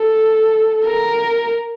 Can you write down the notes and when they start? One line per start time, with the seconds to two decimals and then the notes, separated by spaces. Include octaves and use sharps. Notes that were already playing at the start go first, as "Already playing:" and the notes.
Already playing: A4
0.86 A#4